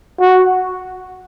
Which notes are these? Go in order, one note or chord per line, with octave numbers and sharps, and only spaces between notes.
F#4